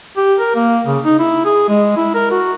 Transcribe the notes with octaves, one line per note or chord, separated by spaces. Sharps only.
G4
A#4
A#3
C#3
D#4
E4
G#4
G#3
E4
A#4
F#4